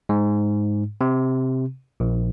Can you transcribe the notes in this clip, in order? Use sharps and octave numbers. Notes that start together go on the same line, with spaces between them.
G#2
C3
A#1